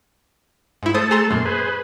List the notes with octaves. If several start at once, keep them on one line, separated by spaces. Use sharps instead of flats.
G#2 E4
A3 A4 C5 D#6
G#4 A#5 C6
F#2 A#2 C6
G#4 B4 C5
B4